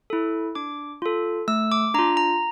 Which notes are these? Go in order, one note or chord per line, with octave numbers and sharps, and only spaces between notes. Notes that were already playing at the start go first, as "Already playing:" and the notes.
E4 A4
D4 D6
F4 A4
A3 E6
D6
D4 F4 A#5
A#5